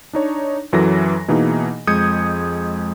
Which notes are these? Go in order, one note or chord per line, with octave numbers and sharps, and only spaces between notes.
D4 D#4 C#5
F#2 E3 F#3 A4 A#6
B2 E3 A#3 D#4 G#4
F2 G#3 D#6 G6 G#6 C#7